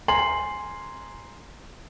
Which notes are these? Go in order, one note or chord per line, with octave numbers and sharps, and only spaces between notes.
G#5 A#5 C6 C7 F#7